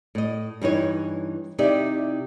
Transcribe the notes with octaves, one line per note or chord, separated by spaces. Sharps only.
A2 D#5
G2 E3 D#4 C#5
C3 D#4 E4 G4 D5